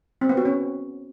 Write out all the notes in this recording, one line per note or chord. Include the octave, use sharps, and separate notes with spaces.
C4
B3
F#4
C#4